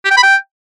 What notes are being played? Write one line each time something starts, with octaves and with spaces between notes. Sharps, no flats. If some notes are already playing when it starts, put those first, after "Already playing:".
G4
G5
B5
G5